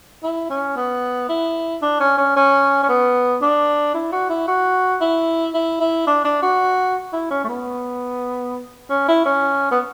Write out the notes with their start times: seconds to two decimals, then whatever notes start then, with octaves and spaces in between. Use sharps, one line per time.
0.23 E4
0.50 C#4
0.76 B3
1.29 E4
1.82 D4
2.00 C#4
2.18 C#4
2.36 C#4
2.83 C#4
2.89 B3
3.42 D4
3.95 E4
4.12 F#4
4.30 E4
4.48 F#4
5.01 E4
5.54 E4
5.80 E4
6.07 D4
6.25 D4
6.42 F#4
7.13 E4
7.31 C#4
7.44 A3
7.49 B3
8.90 C#4
9.08 E4
9.25 C#4
9.71 B3